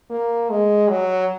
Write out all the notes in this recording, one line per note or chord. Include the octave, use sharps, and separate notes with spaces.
A#3
G#3
F#3